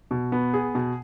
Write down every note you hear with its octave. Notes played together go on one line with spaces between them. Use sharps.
B2
B3
G#4
B2